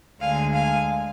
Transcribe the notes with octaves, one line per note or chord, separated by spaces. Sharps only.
D2 D3 G#3 F5 G#5
F5 G#5